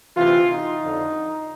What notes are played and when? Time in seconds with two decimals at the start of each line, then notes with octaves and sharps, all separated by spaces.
0.16 D2 C3 E3 F4
0.49 D#4
0.82 F2 D3